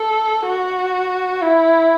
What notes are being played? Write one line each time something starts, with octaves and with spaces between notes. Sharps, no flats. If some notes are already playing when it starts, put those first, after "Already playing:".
Already playing: A4
F#4
E4